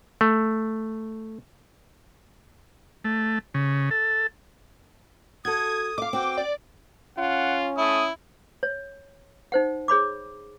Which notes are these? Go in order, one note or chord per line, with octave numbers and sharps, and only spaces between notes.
A3
A3
C#3
A4
F#4 A4 D#6 G#6
D#5 F5 D6
C4 F#4 G5
D5
C#4 F4 F#5
A3 E4 D#6
C#5
D#4 C5 F#5
G#4 C#5 B5 D6